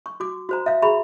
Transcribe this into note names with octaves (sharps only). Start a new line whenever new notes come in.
C#6
F#4 D6
F#4 C5 A#5
E5 F5
F#4 G#4 E5 A#5 B5 C#6